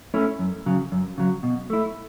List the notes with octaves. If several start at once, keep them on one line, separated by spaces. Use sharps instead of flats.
A3 C#4 E4
F#2
C#3 F#3
F#2
C#3 F#3
B2
A3 E4